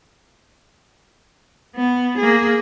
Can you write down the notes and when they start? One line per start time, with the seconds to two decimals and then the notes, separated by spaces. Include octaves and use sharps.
1.75 B3
2.18 A#3 G#4